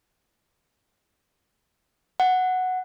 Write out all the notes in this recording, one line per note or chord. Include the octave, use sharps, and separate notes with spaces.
F#5